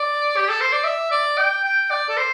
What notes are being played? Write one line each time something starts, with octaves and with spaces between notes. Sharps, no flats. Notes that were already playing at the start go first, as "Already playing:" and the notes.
Already playing: D5
G4
A4
C5
D5
E5
D5
G5
G5
D5
A4
C5